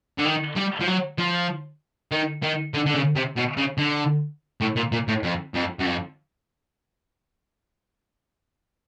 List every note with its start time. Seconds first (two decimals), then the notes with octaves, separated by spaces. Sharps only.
0.18 D3
0.25 D#3
0.56 G3
0.80 F3
0.87 F#3
1.18 F3
2.12 D#3
2.43 D#3
2.74 D3
2.86 D3
2.94 C#3
3.15 C3
3.36 B2
3.57 C#3
3.78 D3
4.61 A2
4.76 A#2
4.92 A#2
5.08 A2
5.23 F2
5.54 F2
5.79 F#2
5.86 F2